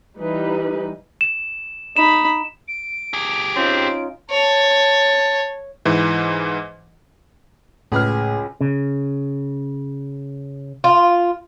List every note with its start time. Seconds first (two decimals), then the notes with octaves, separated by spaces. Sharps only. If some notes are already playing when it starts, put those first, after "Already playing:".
0.18 E3 G3 D#4 B4
1.21 E7
1.96 D#4 B5 E7
2.68 D7
3.13 G4 G#4
3.56 C4 C#4 D#4 F4
4.30 C#5 A5
5.85 G#2 E3
7.92 C#2 A2 G#4 B4 F6
8.61 C#3
10.84 F4